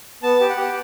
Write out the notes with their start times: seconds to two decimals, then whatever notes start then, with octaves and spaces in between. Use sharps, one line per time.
0.23 B3 A5
0.40 G4
0.49 F#5
0.57 G4